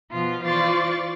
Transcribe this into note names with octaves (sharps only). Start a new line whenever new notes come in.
B2 F3 F4
E3 F4 C5 D5 C#6 A6